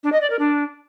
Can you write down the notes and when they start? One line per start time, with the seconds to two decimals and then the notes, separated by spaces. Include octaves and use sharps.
0.03 D4
0.12 D#5
0.21 D5
0.30 A#4
0.39 D4